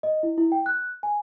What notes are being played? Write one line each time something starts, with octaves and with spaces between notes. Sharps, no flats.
D#5
E4
E4
G5
F#6
G#5